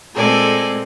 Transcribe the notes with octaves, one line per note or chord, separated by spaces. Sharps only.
A#2 G#3 C4 A4 D5 G#5